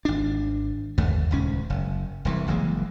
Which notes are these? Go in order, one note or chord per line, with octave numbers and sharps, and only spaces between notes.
G#1 D4
G1 D#2 A3
D#1 C#2 C#4
F#1
E1 C2 E3
F#1 E3 G#3 A#3